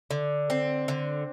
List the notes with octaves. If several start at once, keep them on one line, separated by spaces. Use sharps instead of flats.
D3
C4
D3